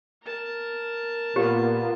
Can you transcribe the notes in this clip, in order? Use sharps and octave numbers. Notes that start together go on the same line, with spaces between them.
A#4 A5
A#2 A#3 B3 F4 G4